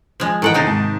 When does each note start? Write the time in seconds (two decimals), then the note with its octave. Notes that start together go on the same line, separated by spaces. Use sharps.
0.20 F3 G#3
0.42 D#3 E3 A4 D#5 F#5 G5
0.54 C3 D#4 C5 D#6 G6 A6
0.67 G#2 A5